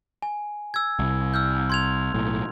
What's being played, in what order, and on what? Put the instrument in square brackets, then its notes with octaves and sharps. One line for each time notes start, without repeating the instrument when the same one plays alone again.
[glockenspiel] G#5
E6 G#6
[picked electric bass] C2
[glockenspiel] E6 F6 G6
C6 G#6 F7
[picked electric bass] B1 A2